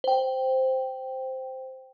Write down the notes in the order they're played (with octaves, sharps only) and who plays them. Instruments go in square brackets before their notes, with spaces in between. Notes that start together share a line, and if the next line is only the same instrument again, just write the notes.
[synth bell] C5 G5